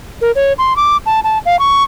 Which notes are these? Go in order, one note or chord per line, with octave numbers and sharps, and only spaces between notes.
A#4
C#5
C6
D6
A5
A5
F5
C#6